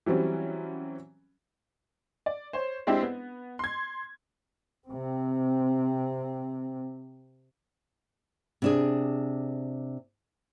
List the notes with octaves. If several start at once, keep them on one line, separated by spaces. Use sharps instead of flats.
E3 F#3 G3 C4 C#4
D5
C5 C#5
G#3 C4 D4 E4 G4
B3
C6 G#6
C3 C4
C3 D4 G#4